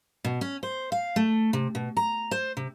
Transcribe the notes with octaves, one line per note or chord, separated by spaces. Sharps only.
B2
C#4
C5
F5
A3
C3
B2
A#5
C5
C3